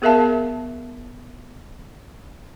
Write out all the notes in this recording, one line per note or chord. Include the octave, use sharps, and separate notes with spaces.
B3 G#4 A#4 E5 F5 A5